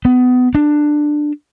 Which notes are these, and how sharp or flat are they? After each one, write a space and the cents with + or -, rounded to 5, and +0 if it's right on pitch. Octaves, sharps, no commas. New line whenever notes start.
B3 +25
D4 +15